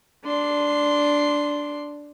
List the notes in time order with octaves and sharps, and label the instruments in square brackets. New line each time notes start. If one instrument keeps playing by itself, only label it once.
[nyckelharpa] D4 C6